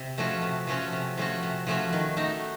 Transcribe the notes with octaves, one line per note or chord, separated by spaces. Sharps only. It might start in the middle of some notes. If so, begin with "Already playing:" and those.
Already playing: C3
F3 A3 C#4 F#4
C3
F3 A3 C#4 F#4
C3
F3 A3 C#4 F#4
C3
F3 A3 C#4 F#4
D#3
A3 D#4 F#4